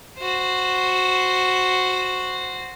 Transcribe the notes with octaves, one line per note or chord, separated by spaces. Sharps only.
F#4 C5